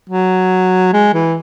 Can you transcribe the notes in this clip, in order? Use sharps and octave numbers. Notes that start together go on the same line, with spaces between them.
F#3
G#3
E3